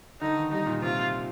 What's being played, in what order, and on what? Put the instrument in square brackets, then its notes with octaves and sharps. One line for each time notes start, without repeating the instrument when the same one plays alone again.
[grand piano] D3 [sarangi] D#4
[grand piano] D#3
[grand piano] G3 [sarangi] D#4
[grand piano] A#2
[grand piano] C3 [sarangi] F4